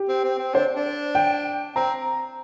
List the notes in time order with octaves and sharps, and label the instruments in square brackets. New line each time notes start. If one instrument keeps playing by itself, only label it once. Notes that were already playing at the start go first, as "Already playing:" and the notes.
Already playing: [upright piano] G4
[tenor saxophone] C4
C4
C4
[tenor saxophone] D4 [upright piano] C5
[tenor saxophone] D4
[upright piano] G5
[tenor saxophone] C4 [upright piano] A#5